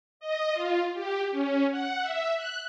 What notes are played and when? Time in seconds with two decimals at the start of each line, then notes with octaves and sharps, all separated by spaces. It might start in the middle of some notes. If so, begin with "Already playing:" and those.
0.20 D#5
0.53 F4
0.94 G4
1.31 C#4
1.71 F#5
2.01 E5
2.35 F#6